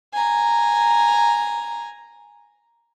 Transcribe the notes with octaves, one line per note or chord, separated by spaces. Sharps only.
G#5 A#5